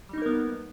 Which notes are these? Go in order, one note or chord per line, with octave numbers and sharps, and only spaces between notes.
G3 A#3 B3 D#4 A#4